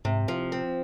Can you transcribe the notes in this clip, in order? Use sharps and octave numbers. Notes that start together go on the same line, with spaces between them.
G#2 C3
F3
C4